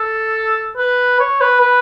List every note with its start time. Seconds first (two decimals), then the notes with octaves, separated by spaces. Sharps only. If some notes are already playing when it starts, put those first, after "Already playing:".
Already playing: A4
0.77 B4
1.20 C#5
1.41 B4
1.61 B4